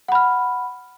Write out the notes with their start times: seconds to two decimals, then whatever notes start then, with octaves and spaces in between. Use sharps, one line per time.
0.08 F#5
0.12 B5
0.15 F6